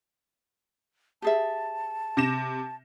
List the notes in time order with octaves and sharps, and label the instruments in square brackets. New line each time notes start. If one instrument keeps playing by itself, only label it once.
[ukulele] G4 G#4 E5 [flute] A5
[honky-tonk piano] C3 A#6 E7